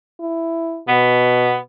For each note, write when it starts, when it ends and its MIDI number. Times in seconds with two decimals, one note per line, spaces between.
0.20 0.81 64
0.88 1.58 47
0.88 1.58 59